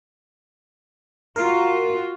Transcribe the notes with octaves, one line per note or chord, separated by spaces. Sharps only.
F4 F#4 A#4